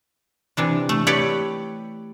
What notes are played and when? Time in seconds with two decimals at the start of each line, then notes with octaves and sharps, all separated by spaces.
0.57 C3 E3 D4
0.89 A3
1.07 G4 B4 C#5 D5 G5